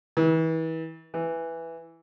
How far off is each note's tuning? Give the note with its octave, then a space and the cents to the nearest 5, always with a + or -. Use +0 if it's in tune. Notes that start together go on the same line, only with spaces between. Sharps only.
E3 -35
E3 +0